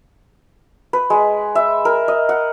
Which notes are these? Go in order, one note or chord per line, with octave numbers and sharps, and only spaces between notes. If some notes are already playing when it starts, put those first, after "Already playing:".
B4
G#3
E5
A#4
D#5
F#5